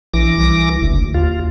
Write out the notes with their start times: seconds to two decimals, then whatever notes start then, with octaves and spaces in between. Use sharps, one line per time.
0.14 A#1 E3 D6 A#6
0.38 C2
0.82 F#1 D2
1.14 D#2 F4